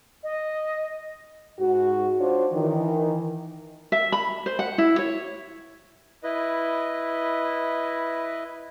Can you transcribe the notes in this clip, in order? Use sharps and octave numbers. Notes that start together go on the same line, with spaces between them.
D#5
G#2 F#4
D4 F4 F#4 C5 C#5
D#3 E3
E5
B5
C5
F#5
E4
C#5
E4 B4 D#5